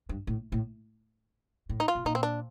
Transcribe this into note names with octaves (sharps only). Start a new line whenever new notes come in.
G2
A2
A2
A2
D#4
F4
C3
A#2 D#4
C4
D4